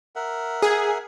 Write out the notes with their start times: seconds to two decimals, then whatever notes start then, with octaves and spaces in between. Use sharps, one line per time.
0.16 A#4 E5 F#5
0.62 G#4